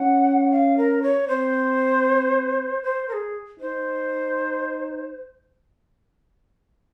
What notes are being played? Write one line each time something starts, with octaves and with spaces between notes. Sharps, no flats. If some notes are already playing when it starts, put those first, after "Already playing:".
Already playing: C#4 F#5
F5
A#4
C#5
C4 C5
C5
A#4
G#4
D#4 C5